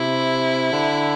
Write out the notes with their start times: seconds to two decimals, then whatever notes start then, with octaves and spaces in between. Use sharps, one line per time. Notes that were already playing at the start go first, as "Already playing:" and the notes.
Already playing: C3 E4
0.72 D3